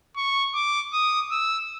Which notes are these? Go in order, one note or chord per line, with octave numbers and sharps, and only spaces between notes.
C#6
D6
D#6
E6